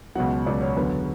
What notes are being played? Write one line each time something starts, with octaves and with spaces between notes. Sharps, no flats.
C#2 B2 F#3 F#5
C#2 B2 F#3 D5
C#5
E2 D3 F#3 B4